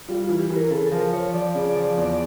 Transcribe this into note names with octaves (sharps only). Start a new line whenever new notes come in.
G3 F4
E3 F4
G4
E3
A#4
C#3 A4
F3 A#4
F3 C#5
F3 D5
C#3
F3
E2